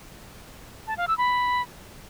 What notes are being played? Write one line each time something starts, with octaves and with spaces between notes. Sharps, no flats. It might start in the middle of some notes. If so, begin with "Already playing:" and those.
A5
F5
E6
B5